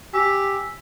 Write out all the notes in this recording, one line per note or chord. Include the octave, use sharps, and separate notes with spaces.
G4 G#5 E6 B6